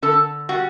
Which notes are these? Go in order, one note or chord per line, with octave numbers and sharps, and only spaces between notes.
D3 A4
G3 F#4